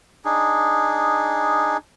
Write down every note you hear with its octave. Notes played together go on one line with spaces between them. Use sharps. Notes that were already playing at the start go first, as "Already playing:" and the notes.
D4 D#4 G#4